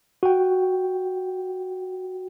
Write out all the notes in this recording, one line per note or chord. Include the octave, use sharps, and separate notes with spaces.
F#4 G5